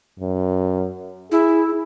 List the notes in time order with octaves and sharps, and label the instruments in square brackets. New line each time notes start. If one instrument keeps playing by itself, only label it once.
[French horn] F#2
[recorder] E4 [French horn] G#4